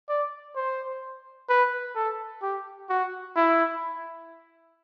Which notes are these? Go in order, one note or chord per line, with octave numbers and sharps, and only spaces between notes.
D5
C5
B4
A4
G4
F#4
E4